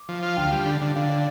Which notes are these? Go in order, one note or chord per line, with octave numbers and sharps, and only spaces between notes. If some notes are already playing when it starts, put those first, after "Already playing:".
Already playing: D6
F3
F4
D2 G5
G3
D3
D3
D3 F5
D5